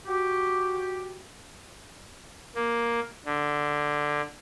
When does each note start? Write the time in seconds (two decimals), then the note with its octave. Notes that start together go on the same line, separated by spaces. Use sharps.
0.07 F#4 G4
2.55 A#3
3.26 D3